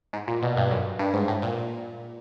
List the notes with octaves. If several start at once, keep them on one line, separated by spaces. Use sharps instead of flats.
G#2
A#2
B2
G2
F#2
G2
G#2
A2
A#2